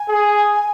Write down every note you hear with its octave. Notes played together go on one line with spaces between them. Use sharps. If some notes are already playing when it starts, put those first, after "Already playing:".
Already playing: G#5
G#4